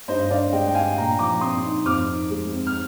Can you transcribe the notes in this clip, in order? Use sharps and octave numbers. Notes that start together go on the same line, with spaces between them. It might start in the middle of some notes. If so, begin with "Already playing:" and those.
G2 C5 D#5
D3 D5 F5
G#3 D#5 G5
G5
D4 F5 G#5
A#2 G5 A#5
F3 A#5 D6
C4 C6 D#6
D#4
F2 D6 F6
D#3
G#3
C4
F6